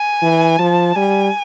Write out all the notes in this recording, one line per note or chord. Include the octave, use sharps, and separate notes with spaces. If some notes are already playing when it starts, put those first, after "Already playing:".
Already playing: G#5
E3
F3 A5
G3 G#5